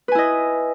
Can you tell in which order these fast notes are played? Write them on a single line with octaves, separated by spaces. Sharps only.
B4 G#5 E4 D#5